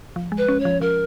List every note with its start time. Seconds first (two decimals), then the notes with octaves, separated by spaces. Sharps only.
0.16 F3
0.32 G#3
0.38 B4
0.48 C#4
0.60 C#5
0.65 F3
0.81 F3 A#4